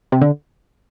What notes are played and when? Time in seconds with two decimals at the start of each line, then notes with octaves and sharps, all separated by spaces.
0.12 C3
0.22 D3